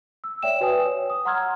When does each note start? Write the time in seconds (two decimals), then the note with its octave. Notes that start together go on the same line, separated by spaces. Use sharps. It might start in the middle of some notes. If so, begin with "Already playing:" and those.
0.24 E6
0.43 C#5 D5 E5 G5 E7
0.61 F#4 B4 G5 G#5 D#6
0.85 C#5
1.10 D#6
1.25 F#5 A#5 C6 E6 F6 G#6